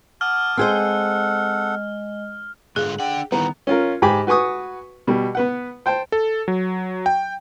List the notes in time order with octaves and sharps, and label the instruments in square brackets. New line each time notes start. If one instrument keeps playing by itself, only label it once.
[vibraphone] F#5 [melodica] A5 D6 D#6 [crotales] F6
[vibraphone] G#3 D#5 [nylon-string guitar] C4 G#4 C5 [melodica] A4 F#5
[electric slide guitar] G#2 D3 F4 [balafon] G#4
[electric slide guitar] D4 F#5 [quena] G5
[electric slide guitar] D#3 G3 [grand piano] E3 B3 [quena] A#5
[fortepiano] C#4 F4 A#4
G#2 G4 G#5 B5 D6
F#4 B4 G#5 C#6 D#6
B2 G3
B3 B4 F#5
C5 G5 A5
[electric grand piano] A4
F#3
G5